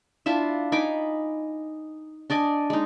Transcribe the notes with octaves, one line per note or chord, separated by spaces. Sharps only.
D4 E4 F4 E5
D#4 G#5 B5 D6
D4 D5 D#5 G#5
G#3 D#4